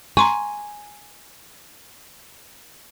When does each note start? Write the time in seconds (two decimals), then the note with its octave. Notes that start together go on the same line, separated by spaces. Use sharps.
0.17 G#5 A#5 C6 C#6